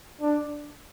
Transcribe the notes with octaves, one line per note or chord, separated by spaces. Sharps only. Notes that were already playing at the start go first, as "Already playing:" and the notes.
D4